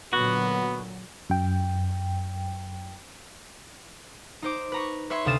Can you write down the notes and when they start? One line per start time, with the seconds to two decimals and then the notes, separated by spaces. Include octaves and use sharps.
0.13 A#2 D3 F#3 B3 F#4
1.29 F#2 G5
4.42 D#4 C5 D6
4.72 B4 A#5 C#6
5.10 B4 C#5 E5 C6 C#6
5.25 D2 C3 F5 D#6 A6 E7